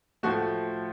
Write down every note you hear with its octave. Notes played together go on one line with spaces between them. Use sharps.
A2 F3 A3 F#4